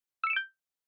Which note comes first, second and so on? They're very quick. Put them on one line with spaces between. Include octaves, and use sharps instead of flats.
E6 C#7 E7 D7 G6